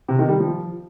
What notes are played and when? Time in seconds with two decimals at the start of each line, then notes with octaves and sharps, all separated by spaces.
0.08 C3
0.19 D#3
0.29 G3
0.40 F3